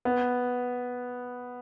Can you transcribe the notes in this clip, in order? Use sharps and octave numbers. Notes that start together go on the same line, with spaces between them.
B3